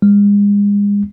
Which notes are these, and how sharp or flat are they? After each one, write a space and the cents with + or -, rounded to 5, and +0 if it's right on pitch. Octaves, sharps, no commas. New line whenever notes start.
G#3 -35